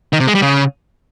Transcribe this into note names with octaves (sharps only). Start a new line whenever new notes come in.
D#3
C3
G#3
G3
C#3